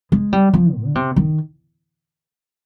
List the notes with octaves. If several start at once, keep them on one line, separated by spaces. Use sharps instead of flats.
G#3
G3
F3
G#2
D3
C3
D#3